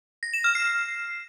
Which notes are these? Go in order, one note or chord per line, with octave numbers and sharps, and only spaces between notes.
A#6
E7
F6
C7